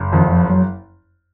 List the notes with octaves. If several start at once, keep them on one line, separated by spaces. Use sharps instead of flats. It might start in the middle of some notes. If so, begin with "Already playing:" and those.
Already playing: F#1
F2 D#3
F3
F#3